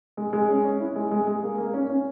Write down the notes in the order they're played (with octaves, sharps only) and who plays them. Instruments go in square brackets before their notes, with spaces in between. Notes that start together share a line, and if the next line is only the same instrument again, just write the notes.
[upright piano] G#3
G#3
C#4
C#4
E4
G#3
G#3
G#3
A#3
A#3
C#4
C#4